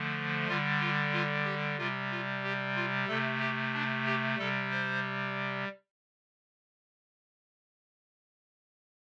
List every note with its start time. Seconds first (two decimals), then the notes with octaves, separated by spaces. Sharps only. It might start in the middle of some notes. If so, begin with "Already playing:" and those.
Already playing: D3 F3 A3
0.48 D3 G3 F4
0.80 F4
1.13 F4
1.45 G4
1.78 C3 G3 F4
2.11 F4
2.43 G4
2.76 F4
3.08 C3 A3 A4
3.40 G4
3.74 D4
4.06 G4
4.38 C3 G3 A4
4.71 C5